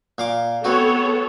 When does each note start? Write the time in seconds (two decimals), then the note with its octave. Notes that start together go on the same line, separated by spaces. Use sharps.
0.18 A#2 F5 D6
0.64 B3 C4 F#4 A4 C#5